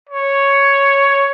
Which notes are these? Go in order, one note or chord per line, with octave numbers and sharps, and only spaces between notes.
C#5